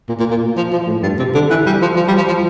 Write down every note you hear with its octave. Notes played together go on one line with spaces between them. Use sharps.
A#2
A#2
A#2
F3
F3
A2
G2
C3
D3
E3
G3
F3
F3
G3
F3
F3